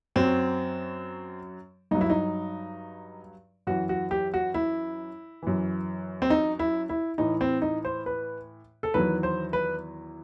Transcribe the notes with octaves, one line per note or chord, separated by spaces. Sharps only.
F#2 F#3 C4
G2 F#3 D#4
E4
D#4
F#2 E3 F#4
F#4
G4
F#4
E4
F#2 E3
C4
D#4
E4
E4
A2 E3 D#4
C4
D#4
C5
B4
A4
E2 D#3 F#3 B4
C5
B4